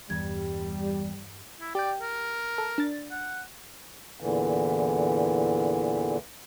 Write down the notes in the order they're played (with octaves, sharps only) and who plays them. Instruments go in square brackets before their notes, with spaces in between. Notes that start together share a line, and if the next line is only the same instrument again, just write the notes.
[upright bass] E2 [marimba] G2 G#6 [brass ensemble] G3
[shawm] E4
[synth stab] G4 G5 [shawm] D5
[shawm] A#4
[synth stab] A4
D4 A6
[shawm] F#5
[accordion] E2 A#2 D3 E3